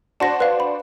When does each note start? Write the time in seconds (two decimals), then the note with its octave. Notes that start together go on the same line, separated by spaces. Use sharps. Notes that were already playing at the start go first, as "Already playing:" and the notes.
0.20 D4 F#4 C5 A5 A#6
0.40 B4 F5
0.60 B5